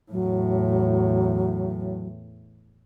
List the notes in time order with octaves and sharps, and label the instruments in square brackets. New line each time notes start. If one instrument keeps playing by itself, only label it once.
[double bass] E2 A2 [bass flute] F#3